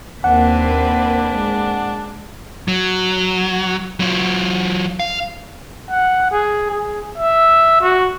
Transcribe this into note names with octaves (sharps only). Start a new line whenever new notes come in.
D#2 A#3 C4 D4 B4 F#5
G#3
F#3
F#3 F4
F5
F#5
G#4
G#4
E5
F#4